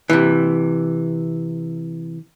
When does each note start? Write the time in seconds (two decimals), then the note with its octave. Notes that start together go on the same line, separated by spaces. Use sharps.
0.10 C3 E3